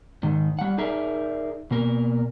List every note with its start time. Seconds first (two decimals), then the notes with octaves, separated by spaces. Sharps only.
0.23 G#2 D#3
0.59 G3 F#5
0.78 D#4 G#4 A#4 D5 E5
1.71 B2 A#3 A#4